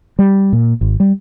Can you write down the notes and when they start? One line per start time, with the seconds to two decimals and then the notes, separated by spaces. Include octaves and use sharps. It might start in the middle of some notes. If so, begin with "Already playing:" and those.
0.19 G3
0.53 A#2
0.81 G#1
1.00 G3